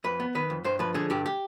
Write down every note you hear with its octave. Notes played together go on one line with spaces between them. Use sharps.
F2 B4
B3
D#3 B4
F2
G2 C5
F3 B4
D3 G#4
G2 G4
G4